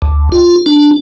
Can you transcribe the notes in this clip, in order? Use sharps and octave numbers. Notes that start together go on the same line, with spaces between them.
D2
F4
D4